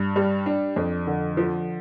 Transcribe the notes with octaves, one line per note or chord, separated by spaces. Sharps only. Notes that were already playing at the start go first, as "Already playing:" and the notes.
Already playing: G2
G3
D4
F2
D3
F3